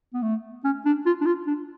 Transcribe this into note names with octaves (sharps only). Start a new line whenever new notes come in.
B3
A3
C#4
D4
F4
D4
F4
D4